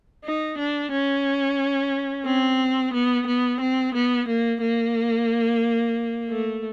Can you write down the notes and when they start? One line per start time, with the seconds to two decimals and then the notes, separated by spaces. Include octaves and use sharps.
0.24 D#4
0.58 D4
0.92 C#4
2.26 C4
2.93 B3
3.27 B3
3.60 C4
3.94 B3
4.28 A#3
4.62 A#3
6.30 A3